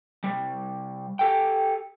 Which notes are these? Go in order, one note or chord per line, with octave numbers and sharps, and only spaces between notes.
C3 G3
G4 A4 G5